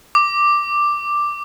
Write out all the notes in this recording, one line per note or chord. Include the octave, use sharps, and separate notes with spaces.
D6